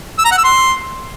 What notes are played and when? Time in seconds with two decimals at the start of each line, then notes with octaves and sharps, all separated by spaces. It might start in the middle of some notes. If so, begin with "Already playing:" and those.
0.19 E6
0.25 A#5
0.31 F#5
0.38 E6
0.44 C6